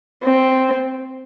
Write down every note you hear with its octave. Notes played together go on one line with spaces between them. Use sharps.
C4